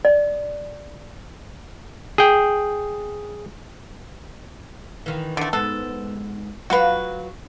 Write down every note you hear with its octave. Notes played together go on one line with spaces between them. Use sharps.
D5
G#4 G5
D#3 E3
D3 A3
G#2 B3 A4
F#3 F4 F#4 B4